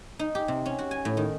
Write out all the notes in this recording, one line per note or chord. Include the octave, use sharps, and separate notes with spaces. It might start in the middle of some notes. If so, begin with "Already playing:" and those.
D#4
G4
C3
C#4
F#4
G#5
A2
D#3